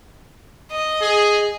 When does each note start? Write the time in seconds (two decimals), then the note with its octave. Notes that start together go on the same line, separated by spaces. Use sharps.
0.71 D#5
1.00 G#4